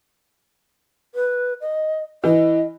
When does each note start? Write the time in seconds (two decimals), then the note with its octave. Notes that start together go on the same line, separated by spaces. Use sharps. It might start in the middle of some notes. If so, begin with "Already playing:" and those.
1.15 B4
1.61 D#5
2.24 E3 D#5